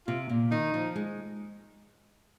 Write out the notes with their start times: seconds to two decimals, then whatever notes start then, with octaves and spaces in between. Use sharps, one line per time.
0.07 C3 F4
0.29 A#2
0.51 D#3 D#4
0.74 F3
0.96 G#3